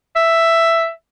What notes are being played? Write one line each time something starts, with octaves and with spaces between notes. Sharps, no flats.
E5